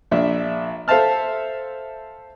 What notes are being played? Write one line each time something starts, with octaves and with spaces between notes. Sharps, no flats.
A#1 D4 E5
A4 C5 E5 F5 A5 F6